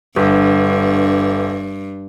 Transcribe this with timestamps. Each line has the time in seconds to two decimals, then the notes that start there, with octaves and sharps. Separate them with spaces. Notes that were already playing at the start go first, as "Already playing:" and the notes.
0.16 G1 G2